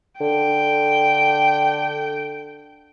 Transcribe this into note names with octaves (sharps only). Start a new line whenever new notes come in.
D3 G5